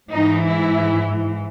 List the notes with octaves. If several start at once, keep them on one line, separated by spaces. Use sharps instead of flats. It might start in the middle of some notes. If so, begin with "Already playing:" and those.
G#2 E3 D#4
E4